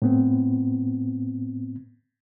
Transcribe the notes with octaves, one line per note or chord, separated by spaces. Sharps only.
A2 B3 C4